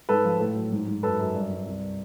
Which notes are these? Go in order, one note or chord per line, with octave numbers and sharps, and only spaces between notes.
G#2 A4 B4
F3
A2
F#3
G#2
G#2
F#2 A4 B4
F#2
G2
G2
C2